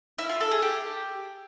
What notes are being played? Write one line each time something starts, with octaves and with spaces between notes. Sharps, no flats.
E4
F4
A4
G#4
G4